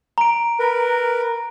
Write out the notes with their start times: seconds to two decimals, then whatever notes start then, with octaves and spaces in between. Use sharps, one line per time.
0.18 A#5 D7
0.59 A#4 B4